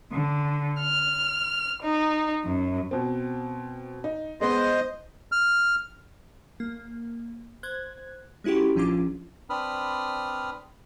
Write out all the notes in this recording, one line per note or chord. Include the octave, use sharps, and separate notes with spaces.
D3
F6
D#4
F#2
B2 C4
D#4
G#3 B3 C5 D#5
F6
A#3
C5 F#6 G#6
G#3 C#4 E4 F#4 G4
A#1 F3 C#4 D4 F4 D6
C4 D4 B4 B5 D#6 F6